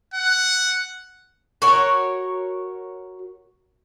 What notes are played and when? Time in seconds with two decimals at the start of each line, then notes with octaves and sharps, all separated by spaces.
0.14 F#5
1.62 F#4 A#4 C#5